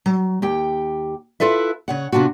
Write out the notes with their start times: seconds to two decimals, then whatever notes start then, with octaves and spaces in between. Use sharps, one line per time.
0.06 F#3
0.42 D#2 G4 G5
1.40 E4 F4 A4 B4 E5
1.88 C#3 C#5 F#5
2.12 C3 B3 D4 F4 F#4